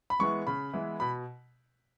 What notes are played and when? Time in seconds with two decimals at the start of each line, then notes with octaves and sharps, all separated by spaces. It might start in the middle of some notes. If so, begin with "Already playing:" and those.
0.10 B5
0.19 E3 G#3 B3 E4 C#6
0.47 C#3 B5
0.73 E3 G#3 B3 E4
1.00 B2 B5